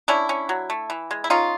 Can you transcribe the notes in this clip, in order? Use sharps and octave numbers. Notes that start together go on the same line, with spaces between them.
C#4 D4 E4
C#4
F#3
A3
E3
G#3
E4
C#4 D#4 F4